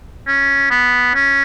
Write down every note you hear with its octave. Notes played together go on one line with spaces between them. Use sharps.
C#4
B3
C#4